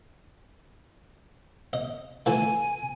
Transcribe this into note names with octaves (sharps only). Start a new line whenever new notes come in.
D#5
E3 A3 G#5